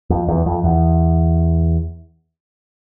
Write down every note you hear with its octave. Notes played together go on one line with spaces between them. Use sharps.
F2
E2
F2
E2